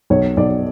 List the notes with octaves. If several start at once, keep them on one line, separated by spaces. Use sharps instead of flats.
B1 C#5
B1 D5